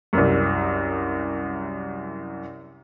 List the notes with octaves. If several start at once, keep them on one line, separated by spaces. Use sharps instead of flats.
C2 F#2